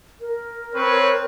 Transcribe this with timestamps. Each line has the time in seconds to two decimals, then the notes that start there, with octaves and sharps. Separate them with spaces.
0.21 A#4
0.75 C4 B4 C#5